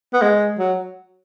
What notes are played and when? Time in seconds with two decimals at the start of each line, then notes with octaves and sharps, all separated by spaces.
0.13 B3
0.22 G#3
0.59 F#3